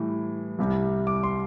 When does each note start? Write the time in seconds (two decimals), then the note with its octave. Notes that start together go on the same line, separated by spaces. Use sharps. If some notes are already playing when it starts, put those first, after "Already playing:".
Already playing: A2 E3 G3
0.59 C2 C3 G3
1.07 D6
1.23 C6